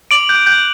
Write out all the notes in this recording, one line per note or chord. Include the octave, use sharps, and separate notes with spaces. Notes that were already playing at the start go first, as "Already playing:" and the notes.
D6 D7 F#7
F#6 G6
F#6 G6